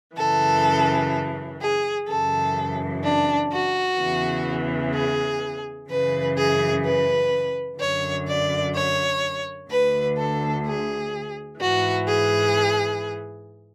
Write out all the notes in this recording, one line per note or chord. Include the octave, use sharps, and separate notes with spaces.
F#2 C#3 E3 A4
G#4
F#2 C#3 E3 A4
D4
F#4
E2 C#3 E3
G#4
F#2 C#3 E3 B4
G#4
B4
F#2 D3 C#5
D5
C#5
D2 D3 B4
A4
G#4
G#2 E3 F#4
G#4